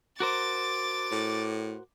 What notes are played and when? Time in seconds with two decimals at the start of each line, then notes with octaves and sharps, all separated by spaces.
0.20 F#4 A#4 C5 D6 A6
1.12 A2